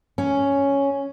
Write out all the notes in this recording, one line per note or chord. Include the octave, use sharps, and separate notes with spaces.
C#4